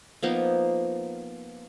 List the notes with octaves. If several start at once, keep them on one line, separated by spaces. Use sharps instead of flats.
F3 A#3 B3 D#4